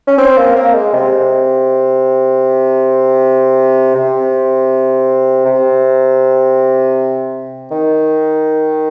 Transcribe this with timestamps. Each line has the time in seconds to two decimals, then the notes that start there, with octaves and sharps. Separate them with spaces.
0.07 C#4
0.18 C4
0.38 A#3
0.56 A#3
0.74 G#3
0.94 C3
3.95 C3
5.46 C3
7.71 D#3